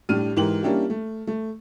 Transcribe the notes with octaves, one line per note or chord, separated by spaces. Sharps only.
A2 G3 D4 F6 D#7
G#2 E3 G4 A#4 F#7
G3 A#3 C#4 D4 E4 G4
A3
A3